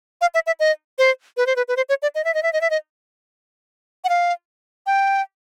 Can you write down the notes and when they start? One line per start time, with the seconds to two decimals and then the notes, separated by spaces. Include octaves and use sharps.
0.21 F5
0.34 E5
0.47 E5
0.60 D#5
0.98 C5
1.37 B4
1.47 C5
1.56 B4
1.68 B4
1.77 C5
1.89 C#5
2.02 D5
2.15 D#5
2.25 E5
2.34 D#5
2.43 E5
2.53 D#5
2.61 E5
2.70 D#5
4.04 F#5
4.09 F5
4.87 G5